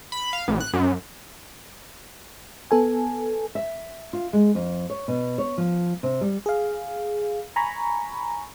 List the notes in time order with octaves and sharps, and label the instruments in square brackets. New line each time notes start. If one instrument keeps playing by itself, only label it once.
[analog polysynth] B5
F5
A1
F#6
F#2
[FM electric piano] B3 A4 G#5
[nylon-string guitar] E5
F4
G#3
F2
C#5
B2
C#5
F3
C3
G3
[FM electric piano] G#4 F5
G#5 A#5 B5 C#6